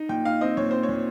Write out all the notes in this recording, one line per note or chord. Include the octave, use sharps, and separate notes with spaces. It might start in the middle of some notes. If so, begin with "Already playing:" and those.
Already playing: D#4
A#2 G5
D#4 F5
C4 D#5
A#2 C#5
C4 C5
C#5
A#2